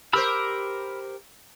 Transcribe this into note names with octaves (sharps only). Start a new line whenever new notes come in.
G4 A#4 C5 B5 E6 F6